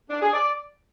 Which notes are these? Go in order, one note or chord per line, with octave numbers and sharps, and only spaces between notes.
D4
G#4
D5